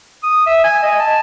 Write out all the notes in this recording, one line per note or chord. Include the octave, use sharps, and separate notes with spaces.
D#6
E5
G#5
D#5
A5